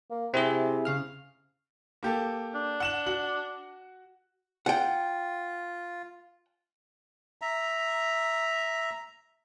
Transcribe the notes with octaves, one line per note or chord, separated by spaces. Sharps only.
A#3
C3 C4 E4 G#4
C#3 F5 F6
A#3 G4 A4
D4
F#5 E7 F#7
F#4 F#5 F#7
F4 F#5 G5
E5 A#5